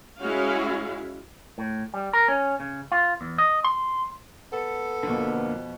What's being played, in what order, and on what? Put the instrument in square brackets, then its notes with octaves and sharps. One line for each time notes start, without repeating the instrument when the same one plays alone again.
[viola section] G#3 C#4 E4 F#4 F5
[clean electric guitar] A2
G3
A#4
C#4
C#3
F4
E2
D#5
C6
[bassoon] B3 [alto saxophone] A4
[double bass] F2 B2 [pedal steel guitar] D3 F3 A#3